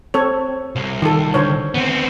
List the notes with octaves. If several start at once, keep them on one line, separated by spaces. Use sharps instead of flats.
C4 A4 C#5
C2
D#3 A4
D3 C5 C#5
B3 C4